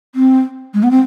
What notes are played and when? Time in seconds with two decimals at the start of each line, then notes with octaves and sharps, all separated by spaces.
0.15 C4
0.74 G#3
0.83 B3
0.91 C4